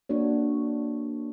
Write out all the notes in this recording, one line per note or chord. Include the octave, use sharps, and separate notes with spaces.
A#3 D4 F#4 C#5